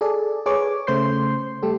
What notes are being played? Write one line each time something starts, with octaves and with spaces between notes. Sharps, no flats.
G#4 A4 D5
G#4 B4 C#5 D6
C#3 A3 C5 C6 G6 C7
G3 A3 G4 A4